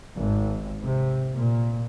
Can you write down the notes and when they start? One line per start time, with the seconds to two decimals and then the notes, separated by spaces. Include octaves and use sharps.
0.16 G#1
0.83 C3
1.34 A#2